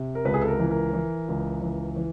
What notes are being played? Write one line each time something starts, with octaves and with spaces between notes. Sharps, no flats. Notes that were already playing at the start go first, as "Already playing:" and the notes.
Already playing: C3
A#4
C#2 B4
G#4
A4
A#4
E3
A#4
E3
C#2
E3
E3